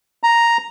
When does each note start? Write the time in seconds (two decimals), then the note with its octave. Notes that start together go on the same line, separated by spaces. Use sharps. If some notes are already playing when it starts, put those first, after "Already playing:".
0.23 A#5